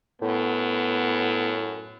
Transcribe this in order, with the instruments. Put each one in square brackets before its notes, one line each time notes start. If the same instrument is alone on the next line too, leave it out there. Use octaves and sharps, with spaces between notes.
[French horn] F#2 [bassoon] A2 [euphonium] B3